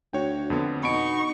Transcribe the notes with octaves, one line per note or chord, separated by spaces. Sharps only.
D2 F#4 C#5 G5
F2 D3 B3
B2 D#4 B5 C#6 D7